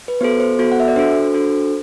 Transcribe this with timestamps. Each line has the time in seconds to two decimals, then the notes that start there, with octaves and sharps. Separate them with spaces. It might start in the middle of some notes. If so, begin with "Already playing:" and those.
0.08 B4
0.21 B3 F#4 A4 C5
0.40 C5
0.59 B3 F#4 A4
0.72 F#5
0.80 E5
0.88 D5
0.96 D4 F#4 A4 C5
1.34 D4 F#4 A4